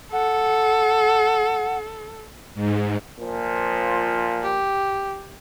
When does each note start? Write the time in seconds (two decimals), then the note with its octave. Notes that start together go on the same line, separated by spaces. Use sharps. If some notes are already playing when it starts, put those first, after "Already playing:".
0.13 A4 F#5
2.55 G#2
3.19 A#2 F3
4.43 G4